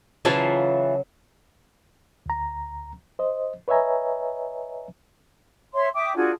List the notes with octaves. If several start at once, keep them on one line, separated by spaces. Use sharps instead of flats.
C#3 E3 F#3 F4 A5
D2 A#5
C5 D#5
B4 C#5 D#5 E5 G#5 A#5
C#5 E5 C6
E5 G5 D6 D#6
D4 F4 F#4 G#4